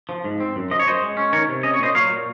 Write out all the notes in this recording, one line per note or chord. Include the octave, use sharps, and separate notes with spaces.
F3
G#2
C4
F#2
F3 D#5
C#5
F#2 C5 D#5
G#3
C#4
D#3 A#4 C#5
C3
C#4 D#5
C#5
A#2 C5 D#5
F#3 C#5 F5
A#2